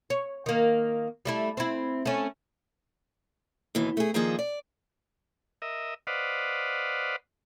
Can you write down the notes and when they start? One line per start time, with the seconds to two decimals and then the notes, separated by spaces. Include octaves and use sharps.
0.10 C#5
0.46 D#3 A#3
1.25 G3 A3 E4
1.57 C4 E4
2.05 A3 C#4
3.75 D#2 B2 E3
3.97 A3 G#4
4.14 D#3 F3 A#3 D4 G#4 A4
4.39 D5
5.62 A#4 D#5 E5
6.07 B4 C5 D5 D#5 F5 F#5